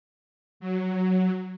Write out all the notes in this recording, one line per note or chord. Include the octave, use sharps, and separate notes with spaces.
F#3